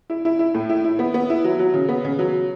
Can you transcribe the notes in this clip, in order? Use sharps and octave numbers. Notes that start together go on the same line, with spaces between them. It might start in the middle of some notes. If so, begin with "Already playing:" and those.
E4
E4
E4
A2
E4
E4
B3
B3
E4
F#3
F#3
C#3
B3
C#3
F#3